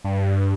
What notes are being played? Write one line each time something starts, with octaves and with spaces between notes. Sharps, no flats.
G2